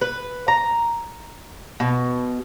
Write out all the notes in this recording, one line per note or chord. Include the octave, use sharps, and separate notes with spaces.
B4
A#5
B2